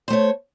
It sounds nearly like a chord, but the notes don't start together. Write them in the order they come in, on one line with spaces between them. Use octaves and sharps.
C5 A3 C#5